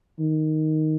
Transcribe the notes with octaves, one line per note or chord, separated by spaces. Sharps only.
D#3